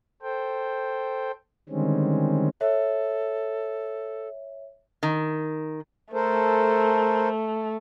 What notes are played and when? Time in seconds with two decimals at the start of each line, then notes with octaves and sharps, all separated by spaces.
0.22 A4 C5 G5
1.69 D3 D#3 G3 G#3 C4 C#4
2.61 A4 C#5 E5
5.03 D#3
6.13 A3 A4 A#4 C5